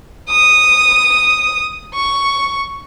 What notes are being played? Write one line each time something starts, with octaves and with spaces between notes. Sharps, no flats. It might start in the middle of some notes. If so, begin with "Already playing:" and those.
D#6
C#6